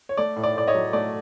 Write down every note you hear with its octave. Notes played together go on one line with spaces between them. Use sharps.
C#5
A3 D5
A2
D5
A2 D5
C#5 D#5
F#3
A3 D5